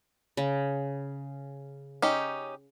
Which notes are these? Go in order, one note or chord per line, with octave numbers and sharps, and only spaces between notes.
C#3
C#4 D#4 G4